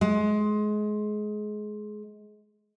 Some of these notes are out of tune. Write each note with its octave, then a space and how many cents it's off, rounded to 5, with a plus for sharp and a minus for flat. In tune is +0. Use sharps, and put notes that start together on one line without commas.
G#3 +25